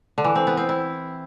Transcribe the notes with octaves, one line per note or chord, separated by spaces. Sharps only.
D3
E3
C4
B3
C4
E4